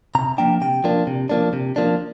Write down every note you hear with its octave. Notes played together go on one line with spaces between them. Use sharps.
C3 A#5
F3 A#3 D4 G5
C3 G5
F3 A#3 D4
C3
F3 A#3 D4
C3
F3 A#3 D4